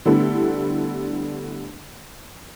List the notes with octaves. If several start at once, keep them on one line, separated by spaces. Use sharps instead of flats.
D3 G3 A3 B3 E4 A4